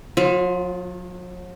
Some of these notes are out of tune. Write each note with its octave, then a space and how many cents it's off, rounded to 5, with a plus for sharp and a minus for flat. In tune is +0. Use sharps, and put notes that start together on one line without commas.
F#3 -45 F4 +0